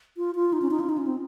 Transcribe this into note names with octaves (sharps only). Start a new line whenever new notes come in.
F4
F4
D#4
C#4
D#4
F4
D#4
C#4
C4